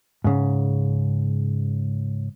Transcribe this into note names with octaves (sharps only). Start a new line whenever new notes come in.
G#2 C#3